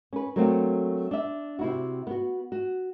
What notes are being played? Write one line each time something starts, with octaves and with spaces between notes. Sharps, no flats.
C#4 B4
F#3 A3 A#3 C4 D4 F#4
D4 E5
C3 E4 F#4
B3 F#4
F#4